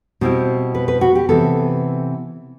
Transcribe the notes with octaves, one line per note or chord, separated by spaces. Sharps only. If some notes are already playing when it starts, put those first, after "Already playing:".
B2 G3 C4 E4
B4
B4
F#4
G4
C3 E3 B3 A4